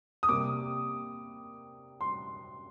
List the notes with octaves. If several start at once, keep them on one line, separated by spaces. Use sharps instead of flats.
D#6
C3 G3 A#3 D6
C6